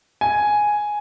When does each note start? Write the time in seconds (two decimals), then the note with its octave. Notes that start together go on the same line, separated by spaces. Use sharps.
0.21 G#5